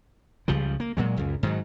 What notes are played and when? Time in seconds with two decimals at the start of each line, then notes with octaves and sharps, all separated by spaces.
0.48 C#2 C#3 F3 G3
0.80 A#3
0.97 A#2 F#3 G#3
1.17 C#2 F#2
1.43 G#2 D#3 F#3